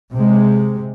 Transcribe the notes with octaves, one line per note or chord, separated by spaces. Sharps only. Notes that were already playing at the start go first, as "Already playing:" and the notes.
C3 G#3